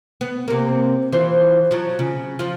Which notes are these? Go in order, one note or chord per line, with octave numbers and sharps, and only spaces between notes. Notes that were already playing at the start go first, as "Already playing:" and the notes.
B3
C3 A#3
E3 F4 C5
F3 F#3
C#3
F3 F4